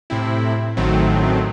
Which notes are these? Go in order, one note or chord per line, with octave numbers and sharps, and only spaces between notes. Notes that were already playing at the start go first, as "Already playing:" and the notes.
A2 C3 C4 E4
A1 A2 D#3 F#3 A3 C4